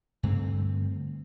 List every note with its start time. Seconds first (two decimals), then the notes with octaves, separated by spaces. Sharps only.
0.23 G2 D3 A3 C4